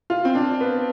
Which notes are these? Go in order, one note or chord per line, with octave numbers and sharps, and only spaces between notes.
F4
C4
D4
B3